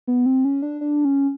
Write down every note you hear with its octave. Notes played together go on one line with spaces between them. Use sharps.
B3
C4
C#4
D4
D4
C#4